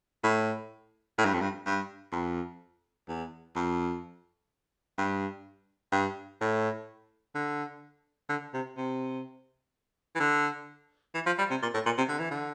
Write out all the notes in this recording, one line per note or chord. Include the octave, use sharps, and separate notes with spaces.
A2
A2
G2
F2
G2
G2
F2
E2
F2
G2
G2
A2
D3
D3
C3
C3
E3
D3
E3
F3
G3
C3
A#2
A2
A#2
C3
D3
E3
D3